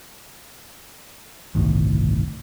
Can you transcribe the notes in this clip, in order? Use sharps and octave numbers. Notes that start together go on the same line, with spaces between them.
G1 C2 A2 D#3